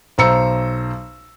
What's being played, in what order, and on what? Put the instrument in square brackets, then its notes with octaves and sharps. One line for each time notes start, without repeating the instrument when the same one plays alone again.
[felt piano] B1 C5 A#5 E6 C#7